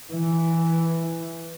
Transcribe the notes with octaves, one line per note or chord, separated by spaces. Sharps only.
E3